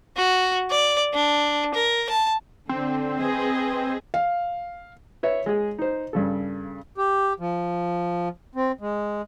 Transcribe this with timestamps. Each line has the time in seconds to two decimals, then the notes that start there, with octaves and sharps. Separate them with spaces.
0.17 F#4
0.70 D5
1.14 D4
1.74 A#4
2.09 A5
2.69 D3 C4
3.21 G#4 B4 D#5
4.14 F5
5.23 B4 C#5 E5
5.46 G#3 G#4
5.79 D#4 C5
6.13 G2 C#3 A4
6.98 G4
7.40 F3
8.55 C4
8.81 G#3